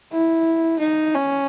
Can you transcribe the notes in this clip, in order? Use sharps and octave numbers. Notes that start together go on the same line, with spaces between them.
E4
D#4
C#4